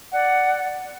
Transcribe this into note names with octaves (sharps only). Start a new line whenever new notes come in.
D5 F#5